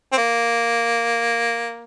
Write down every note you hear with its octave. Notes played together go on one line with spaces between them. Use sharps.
C4
A#3